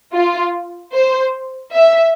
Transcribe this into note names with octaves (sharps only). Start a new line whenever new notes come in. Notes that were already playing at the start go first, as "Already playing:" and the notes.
F4
C5
E5